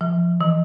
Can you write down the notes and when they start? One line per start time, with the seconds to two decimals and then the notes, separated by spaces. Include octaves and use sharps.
0.01 F3
0.41 E3